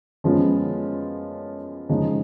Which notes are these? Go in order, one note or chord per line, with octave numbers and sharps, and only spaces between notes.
F#2 F3 G#3 B3 F4
F#2 C#3 F3 G#3 D#4